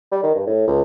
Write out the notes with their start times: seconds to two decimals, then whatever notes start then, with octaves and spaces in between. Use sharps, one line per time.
0.11 G3
0.23 D#3
0.35 G2
0.47 A2
0.67 C#2